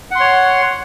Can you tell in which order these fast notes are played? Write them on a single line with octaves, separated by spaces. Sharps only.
F#5 C6 C#5